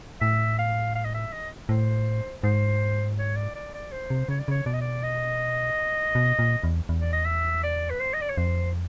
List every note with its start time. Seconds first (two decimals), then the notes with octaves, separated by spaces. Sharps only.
0.21 A2 E5
0.58 F5
0.95 F5
1.05 D#5
1.14 E5
1.33 D#5
1.69 A2 C5
2.43 G#2 C5
3.18 C#5
3.36 D5
3.56 D5
3.74 D5
3.92 C5
4.10 C3
4.29 C#3 C#5
4.39 D5
4.48 C#3 C#5
4.66 B2 D5
4.73 D#5
4.81 D5
5.03 D#5
6.15 B2
6.39 A#2
6.64 E2
6.89 E2
7.00 D5
7.13 D#5
7.25 E5
7.63 D5
7.90 B4
8.00 C5
8.13 D#5
8.21 D5
8.29 C#5
8.37 F2 C5